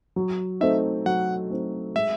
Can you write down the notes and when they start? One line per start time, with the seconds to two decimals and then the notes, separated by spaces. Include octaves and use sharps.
0.16 F#3
0.61 A3 C4 D#4 E5
1.06 F#3 F#5
1.50 A3 C4 D#4
1.96 G#3 E5